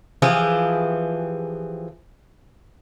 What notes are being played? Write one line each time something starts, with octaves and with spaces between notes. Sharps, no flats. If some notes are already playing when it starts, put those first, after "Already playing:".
E3 F3 G4 G#4